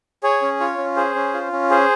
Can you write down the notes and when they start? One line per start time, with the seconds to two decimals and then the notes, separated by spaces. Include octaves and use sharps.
0.23 G#4 C#5
0.42 C#4
0.60 F4 C#5
0.78 C#4
0.96 G#4 C5
1.15 C#4
1.34 F4
1.52 C#4
1.70 G#4 C5